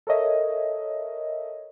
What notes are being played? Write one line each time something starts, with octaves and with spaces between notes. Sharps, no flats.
A4 A#4 C#5 D#5 E5